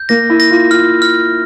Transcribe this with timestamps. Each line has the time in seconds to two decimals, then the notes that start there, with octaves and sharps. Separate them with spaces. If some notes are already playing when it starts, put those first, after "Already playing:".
Already playing: G6
0.09 A#3 A#6
0.30 E4
0.40 A#6
0.50 F4
0.71 F4 F6
1.02 F6